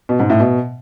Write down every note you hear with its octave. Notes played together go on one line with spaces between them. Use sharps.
B2
G#2
A2
B2